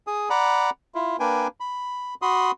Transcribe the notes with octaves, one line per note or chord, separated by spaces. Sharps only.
G#4 D#6
D5 F#5 A#5 B5
E4 F4
A#3 D4 B4 G5 G#5
B5
F#4 B5 C6 D#6